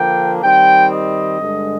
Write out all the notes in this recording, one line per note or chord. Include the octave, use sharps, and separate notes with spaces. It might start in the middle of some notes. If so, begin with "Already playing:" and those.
Already playing: D3 F3 A#3 D4 G5
D#3 G3 C4 G5
D#5
G2 D3 G#3